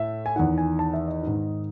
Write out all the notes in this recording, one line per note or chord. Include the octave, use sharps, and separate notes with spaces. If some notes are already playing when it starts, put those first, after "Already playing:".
Already playing: A2 E5
G#5
E2 D#3 F#5
G#5
A5
E5
D#5
G#2 D#3